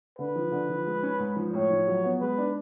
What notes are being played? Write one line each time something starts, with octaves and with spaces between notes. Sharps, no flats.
D3 B4
F3
D3
F3
G#3
C#4
G#2
F3
A2 C#5
F3
F#3
B3
G#3 B4
D4